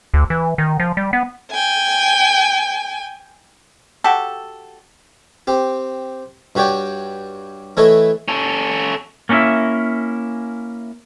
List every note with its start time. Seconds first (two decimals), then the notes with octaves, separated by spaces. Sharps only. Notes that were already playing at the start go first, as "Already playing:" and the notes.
0.14 D2
0.30 E3
0.58 D#3
0.80 F3
0.97 G3
1.13 B3
1.52 G5 G#5
4.04 F#4 G4 A4
5.47 C4 G4
6.55 G2 F#4 G4 C#5 D5 G5
7.77 E3 A3 E4 A4 C#5 D#5
8.28 C#4 A4
9.29 A#3 C#4 D4 E4 E5